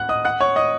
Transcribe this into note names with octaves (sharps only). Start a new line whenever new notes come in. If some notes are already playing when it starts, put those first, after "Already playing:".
Already playing: F#5 F#6
D#5 D#6
F#5 F#6
C#5 C#6
D#5 D#6